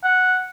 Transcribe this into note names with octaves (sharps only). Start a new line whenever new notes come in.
F#5